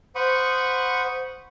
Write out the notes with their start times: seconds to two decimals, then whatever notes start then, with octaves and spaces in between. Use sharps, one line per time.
0.15 C5 F#5 B5 C#6 D#6